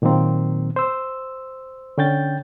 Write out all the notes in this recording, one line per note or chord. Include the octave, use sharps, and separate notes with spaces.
A#2 D#3 F#3 A#3 C4
C5 E6
D3 C#4 G5 G6 A6